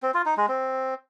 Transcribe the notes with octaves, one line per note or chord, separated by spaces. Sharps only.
C4
F4
D#4
G#3
C4